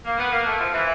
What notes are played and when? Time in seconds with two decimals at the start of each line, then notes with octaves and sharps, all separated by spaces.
0.05 A#3
0.18 B3
0.32 A#3
0.46 A3
0.60 F3
0.73 E3